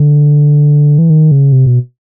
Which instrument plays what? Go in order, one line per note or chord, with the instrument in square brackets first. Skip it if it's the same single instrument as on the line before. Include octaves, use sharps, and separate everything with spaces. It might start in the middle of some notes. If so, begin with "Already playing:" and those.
Already playing: [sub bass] D3
E3
D#3
C#3
C3
B2